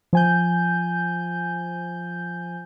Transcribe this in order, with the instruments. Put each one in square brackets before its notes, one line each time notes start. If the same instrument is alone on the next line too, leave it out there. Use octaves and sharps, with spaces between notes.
[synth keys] F3 G#5 G6